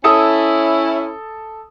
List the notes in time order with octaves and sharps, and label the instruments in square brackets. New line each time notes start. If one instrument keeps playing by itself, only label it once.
[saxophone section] C#4 E4 [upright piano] A4 A5 D#6